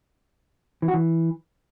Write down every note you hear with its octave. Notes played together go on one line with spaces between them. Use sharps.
E3
F#4
E3